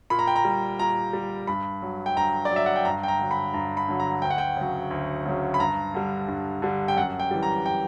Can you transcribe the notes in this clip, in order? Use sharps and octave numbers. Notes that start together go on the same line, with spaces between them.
A#2 B5
A#5
G5
A#5
G3
A#2 A#5
G3
G2 B5
F#3
G5
G2 A#5
D5
F#3
E5
F#5
G5
G2 A#5
G5
A#5
D3 F#3
B5
G2 A#5
B5
D3 F#3
A#5
D2 G5
F#5
G5
C#3 F#3
D2
C#3 F#3
B5
G2 A#5
D3 G3
G2
D3 G3
G5
F#2 F#5
G5
E3 G3
A#5
G5